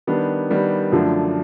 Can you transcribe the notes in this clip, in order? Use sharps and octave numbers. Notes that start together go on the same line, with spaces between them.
D#3 G3 B3 D4
D#3 G3 B3 D4
F#2 D3 F3 A3 D4